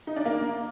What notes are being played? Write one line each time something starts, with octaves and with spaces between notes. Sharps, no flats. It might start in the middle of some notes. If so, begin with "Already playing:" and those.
D#4
D4
A#3